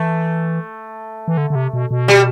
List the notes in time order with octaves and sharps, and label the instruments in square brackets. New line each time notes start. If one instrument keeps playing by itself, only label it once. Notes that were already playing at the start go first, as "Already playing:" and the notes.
Already playing: [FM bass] E3 [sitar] A3
[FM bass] E3
D3
D3
C3
B2
B2
[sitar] G3